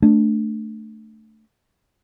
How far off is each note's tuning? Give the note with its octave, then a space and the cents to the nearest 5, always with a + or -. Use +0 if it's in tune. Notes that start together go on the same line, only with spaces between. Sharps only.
A3 +0 D4 +0